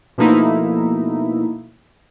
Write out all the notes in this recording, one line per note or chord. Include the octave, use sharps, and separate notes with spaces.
B2 F3 A3 A#3 D#4 E4